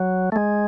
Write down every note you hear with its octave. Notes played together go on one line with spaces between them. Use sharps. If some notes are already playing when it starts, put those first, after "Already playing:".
Already playing: F#3
A3
G#3